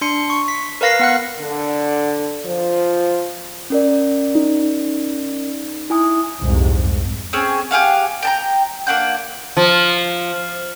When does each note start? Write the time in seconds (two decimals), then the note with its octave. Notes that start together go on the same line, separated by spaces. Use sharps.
0.01 D4 C6 C#7
0.30 C#6
0.48 B6
0.81 A#4 B4 F5 A#6 C7
0.99 B3 F#5 F#6
1.39 D3
2.45 F3
3.70 C#4 A#4 D5
4.35 D#4
5.90 E4 G#5 D#6
6.41 C2 F2 G#2 C3
7.33 C4 C#4 G#4
7.71 G4 G#4 F5 F#5
8.23 G5 A5 A#5
8.87 A#3 D4 F#5 G6
9.57 F3